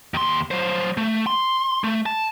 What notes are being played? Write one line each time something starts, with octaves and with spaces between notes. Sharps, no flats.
D#2 C6
F#3 C5
A3
C6
A3
A5